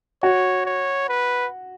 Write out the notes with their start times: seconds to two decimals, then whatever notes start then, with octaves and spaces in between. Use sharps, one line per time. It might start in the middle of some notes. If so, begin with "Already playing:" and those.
0.23 F#4 C#5
0.66 C#5
1.09 B4